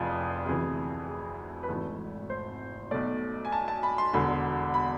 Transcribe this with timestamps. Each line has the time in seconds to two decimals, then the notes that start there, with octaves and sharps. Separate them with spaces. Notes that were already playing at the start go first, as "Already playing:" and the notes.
Already playing: F1 F2 E3 F4 G#4 D5
0.46 D2 C3 E3 G#4
1.08 G#4
1.63 B4
1.69 G#1 G#2 E3 A3 A4
2.30 C5
2.91 B1 B2 A3 D5
3.45 G#5
3.52 A5
3.68 A5
3.83 B5
3.98 C6
4.13 E1 E2 D3 B5
4.74 B5